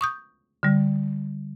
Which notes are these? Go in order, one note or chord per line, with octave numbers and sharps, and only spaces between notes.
C#6 D#6 G6
D3 G3